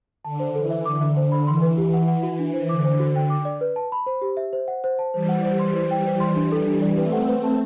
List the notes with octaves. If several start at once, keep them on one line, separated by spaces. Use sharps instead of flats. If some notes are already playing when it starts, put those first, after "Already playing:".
D3 A5
C5
E3 A4
E5
D3 D6
E5
C5
B5
E3 C6
B4
G4
F#5
F#5
F#4
D4
C5
D3 D6
C5
F#4
G5
D6
D5
B4
A5
B5
C5
G4
E5
C5
F#5
C5
A5
E3 G3 C5
F#5
C5
C6
C5
G5
C5
C6
D4
A4
D4
D5
A3 C4 B4
F#5
B4
A5